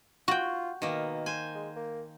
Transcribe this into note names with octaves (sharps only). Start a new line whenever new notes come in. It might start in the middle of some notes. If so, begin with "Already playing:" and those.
F4 F#4 G5
B2 D#3 A#3
C5 G#5
G#3
A#3